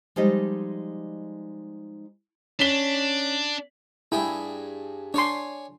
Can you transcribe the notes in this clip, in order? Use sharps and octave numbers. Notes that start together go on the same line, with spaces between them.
F3 G3 G#3 D#4 D#5
C#4 D4 B6 G7
G2 E4 G#4 G5
D4 C#5 D5 G#5 C6